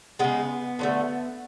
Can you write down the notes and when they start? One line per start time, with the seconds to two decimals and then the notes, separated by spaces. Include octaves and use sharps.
0.19 C#3 G#3 B3
0.79 D3 F#3 A3